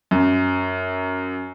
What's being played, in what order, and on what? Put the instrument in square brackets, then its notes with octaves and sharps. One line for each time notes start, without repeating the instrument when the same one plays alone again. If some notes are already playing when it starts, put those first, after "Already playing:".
[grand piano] F#2